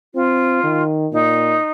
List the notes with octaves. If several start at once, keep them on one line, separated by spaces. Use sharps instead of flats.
C4 F4
D#3
A#2 D#4